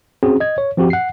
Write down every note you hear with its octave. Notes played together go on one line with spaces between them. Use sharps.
C4 C#4 F#4 G#4
D#5 G#6
C#5
F3 C4 F#4 G4
F#5 C7